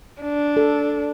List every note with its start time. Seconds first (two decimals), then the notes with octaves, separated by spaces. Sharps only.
0.22 D4
0.57 A4